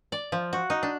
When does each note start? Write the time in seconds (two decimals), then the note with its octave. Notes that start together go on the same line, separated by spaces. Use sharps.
0.12 D5
0.32 F3
0.53 F#4
0.70 D#4
0.83 D4